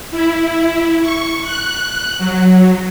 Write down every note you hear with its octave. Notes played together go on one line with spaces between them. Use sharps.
E4
C#6
F#6
F#3